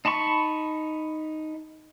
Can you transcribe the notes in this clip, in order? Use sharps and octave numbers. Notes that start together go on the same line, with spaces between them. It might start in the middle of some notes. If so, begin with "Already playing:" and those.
D#4 A5 B5 C#6